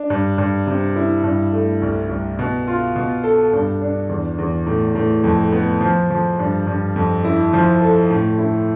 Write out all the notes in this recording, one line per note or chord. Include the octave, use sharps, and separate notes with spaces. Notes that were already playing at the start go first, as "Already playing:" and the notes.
Already playing: D4
G2
G2
C3
E4
G2
A3
C2
C2
B2
F4
B2
A4
G2
D4
E2
E2
A2
A2
F2
B3
F3
F3
G2
G2
F2
E4
F3
A4
A2
E4